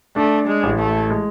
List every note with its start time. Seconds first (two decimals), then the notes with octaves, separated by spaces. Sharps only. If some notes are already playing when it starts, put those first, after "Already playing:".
0.16 A3 D4
0.47 G#3
0.63 A1
0.79 A3
1.10 G#3